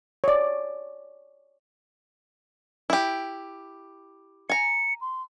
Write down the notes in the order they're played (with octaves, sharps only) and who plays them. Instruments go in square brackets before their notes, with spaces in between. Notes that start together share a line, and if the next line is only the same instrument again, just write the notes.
[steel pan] C#5 D5
[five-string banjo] E4 G4
[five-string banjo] G#5 A#5 [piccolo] C#7
[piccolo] C6